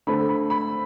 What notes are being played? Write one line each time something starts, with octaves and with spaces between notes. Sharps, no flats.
D3 A3 C4 B5
B5
B5